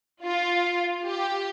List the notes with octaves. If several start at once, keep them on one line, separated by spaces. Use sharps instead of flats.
F4
G4